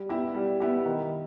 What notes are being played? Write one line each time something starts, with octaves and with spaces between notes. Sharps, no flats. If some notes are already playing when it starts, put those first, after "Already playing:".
Already playing: G3
B3 E4 G4
G3
B3 E4 G4
D#3